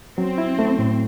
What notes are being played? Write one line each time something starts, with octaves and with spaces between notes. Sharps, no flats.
F#3 C4
E4
A3
A2